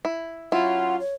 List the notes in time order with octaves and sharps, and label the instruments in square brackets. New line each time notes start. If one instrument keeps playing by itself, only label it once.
[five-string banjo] E4
[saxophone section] F#3 C#4 F4 [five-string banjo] E4 [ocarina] F#5
[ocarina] C#5